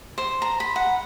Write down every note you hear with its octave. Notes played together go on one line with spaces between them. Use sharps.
C5
A#5
B5
F#5